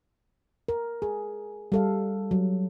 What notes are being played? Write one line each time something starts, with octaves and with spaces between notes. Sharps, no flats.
A#4
G#4
G3 A4 F5
F#3